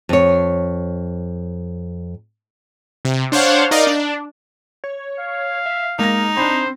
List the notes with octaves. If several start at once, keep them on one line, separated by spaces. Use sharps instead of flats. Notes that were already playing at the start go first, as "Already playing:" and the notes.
F2 C#5
C3
D4 C5 C#5 F5 F#5
D#4 A#4 D5 D#5 F5
D4
C#5
F5
E5
G#3 A#3 D#4 A#6
C4 D4 C5 B5